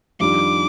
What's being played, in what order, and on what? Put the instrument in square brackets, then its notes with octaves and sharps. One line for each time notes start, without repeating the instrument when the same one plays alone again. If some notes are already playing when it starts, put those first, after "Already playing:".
[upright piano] F2 D#3 G3 D4 F4 [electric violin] D6